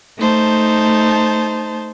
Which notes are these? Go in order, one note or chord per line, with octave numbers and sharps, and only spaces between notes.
A3 D#4 C5 A5